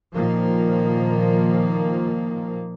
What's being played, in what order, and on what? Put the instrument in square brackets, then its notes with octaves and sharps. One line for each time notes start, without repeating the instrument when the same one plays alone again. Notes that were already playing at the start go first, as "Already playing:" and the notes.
[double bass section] A#2 D#3 F3 A#3